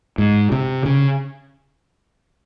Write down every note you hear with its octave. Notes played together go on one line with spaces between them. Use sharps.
G#2
C3
C#3